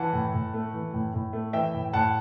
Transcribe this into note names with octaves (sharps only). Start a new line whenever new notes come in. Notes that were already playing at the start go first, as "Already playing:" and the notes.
Already playing: E3 F#5 A5
A2
A2
A3
E3
A2
A2
A3
E3 E5 G5
A2
A2 F#5 A5